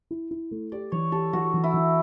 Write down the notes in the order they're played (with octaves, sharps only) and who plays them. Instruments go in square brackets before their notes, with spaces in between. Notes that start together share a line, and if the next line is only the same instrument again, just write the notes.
[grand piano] E4
E4
A3
[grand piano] G4 [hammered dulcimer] D5
[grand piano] E3 [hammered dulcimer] C#5
[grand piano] G4 [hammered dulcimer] A4
[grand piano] E3 [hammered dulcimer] F#4
[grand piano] E3
[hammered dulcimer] E4
[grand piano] E3